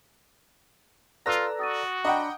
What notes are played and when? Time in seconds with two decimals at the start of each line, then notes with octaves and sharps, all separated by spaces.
1.26 F4 A4 B4 D5 A#5 E6 F#6 A#6
1.59 F#4 D#6 A6 D#7
2.05 D4 D#5 F#5 G5 A#5 B5 D6